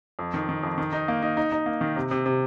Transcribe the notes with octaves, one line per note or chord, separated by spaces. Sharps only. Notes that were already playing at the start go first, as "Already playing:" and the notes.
F2
D#3
D#3
F2
D#3
D#4
A#3
D#4
D#4
D#4
A#3
D#3
C3
C3
C3